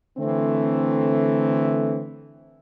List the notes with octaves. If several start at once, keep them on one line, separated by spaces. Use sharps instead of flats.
D3 E3 A3 C4